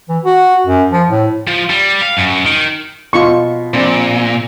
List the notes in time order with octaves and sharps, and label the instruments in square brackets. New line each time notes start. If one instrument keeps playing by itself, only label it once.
[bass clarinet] E3
F#4
F#2
F3
A2
[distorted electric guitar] F3
G3
F5
F#2
D#3
[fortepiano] B2 [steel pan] F4 C#6
[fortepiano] A#1 C4 [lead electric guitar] A#2